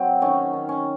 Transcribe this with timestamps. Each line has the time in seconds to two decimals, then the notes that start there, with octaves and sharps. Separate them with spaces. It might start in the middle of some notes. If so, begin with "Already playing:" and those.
Already playing: F#3 C4
0.22 D#3 C#4
0.53 D#3
0.69 C#4